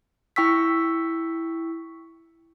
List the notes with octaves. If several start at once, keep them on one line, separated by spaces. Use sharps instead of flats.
E4 G5 C#6 E6 B6